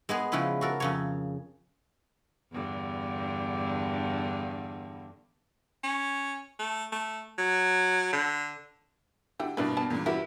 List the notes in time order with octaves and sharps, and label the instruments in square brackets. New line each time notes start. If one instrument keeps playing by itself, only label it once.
[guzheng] G#3 B3 G#4
C#3 F3 C#4 E4 B4
F#4 A4 A#4
F2 C#3 C#5
[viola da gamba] E2 G2 D3
[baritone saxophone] C#4
A3
A3
F#3
D3
[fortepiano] D3 [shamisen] E4 F#4 [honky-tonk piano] G4
[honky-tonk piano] G2 B2 [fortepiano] A#3 D4 B5 [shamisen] E4 B4
[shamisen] B3 A5
[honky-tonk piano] E2 G2 [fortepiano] A#2
[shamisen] C#4 A#4 [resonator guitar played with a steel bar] E4 [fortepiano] F#4 G4 B4